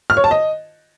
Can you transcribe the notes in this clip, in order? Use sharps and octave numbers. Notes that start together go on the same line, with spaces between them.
F6
C#5
A5
D#5